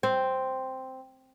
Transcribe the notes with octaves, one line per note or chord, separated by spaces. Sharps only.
C4